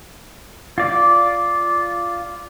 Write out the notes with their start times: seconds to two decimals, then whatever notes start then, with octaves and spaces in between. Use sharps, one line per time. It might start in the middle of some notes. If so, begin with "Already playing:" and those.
0.78 F4 D5